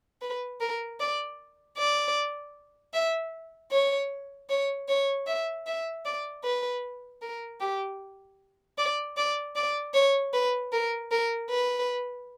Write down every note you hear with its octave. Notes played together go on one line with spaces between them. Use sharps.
B4
A#4
D5
D5
E5
C#5
C#5
C#5
E5
E5
D5
B4
A#4
G4
D5
D5
D5
C#5
B4
A#4
A#4
B4